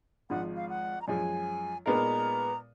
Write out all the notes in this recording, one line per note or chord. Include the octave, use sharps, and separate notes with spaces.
G#1 G#2 F3 F#5
F5
F#5
A#5
F#2 F3 G#3 G#5
A#2 G#3 B3 D#4 A#4 A#5